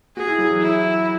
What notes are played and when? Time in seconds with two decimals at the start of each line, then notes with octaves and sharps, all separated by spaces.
0.17 F#4 G#4
0.28 E4
0.38 F#3
0.50 E3
0.61 E4